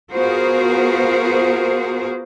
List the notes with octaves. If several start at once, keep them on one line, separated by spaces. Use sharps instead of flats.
B3 F4 F#4 G#4 A#4 C5